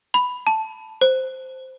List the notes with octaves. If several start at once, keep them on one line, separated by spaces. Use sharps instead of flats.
B5
A5
C5